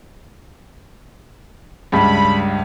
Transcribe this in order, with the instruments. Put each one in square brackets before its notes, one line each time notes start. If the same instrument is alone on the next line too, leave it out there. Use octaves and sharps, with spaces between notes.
[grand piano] C#2 G2 [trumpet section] B5